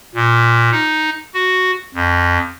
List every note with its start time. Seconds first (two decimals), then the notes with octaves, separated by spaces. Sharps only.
0.15 A#2
0.72 D#4
1.34 F#4
1.95 F2